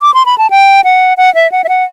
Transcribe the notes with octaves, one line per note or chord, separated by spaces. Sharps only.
D6
C6
B5
A5
G5
F#5
F#5
E5
F#5
E5
F#5